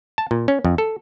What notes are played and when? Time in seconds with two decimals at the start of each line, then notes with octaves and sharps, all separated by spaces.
0.18 A5
0.31 A#2
0.48 C#4
0.65 F2
0.78 A4